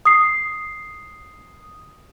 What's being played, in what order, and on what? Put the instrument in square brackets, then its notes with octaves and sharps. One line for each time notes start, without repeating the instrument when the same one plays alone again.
[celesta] D#6 C7